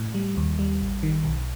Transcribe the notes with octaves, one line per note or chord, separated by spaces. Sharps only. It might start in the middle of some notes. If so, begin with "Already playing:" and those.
Already playing: A2
G3
D#2
G3
A1
D#3
B1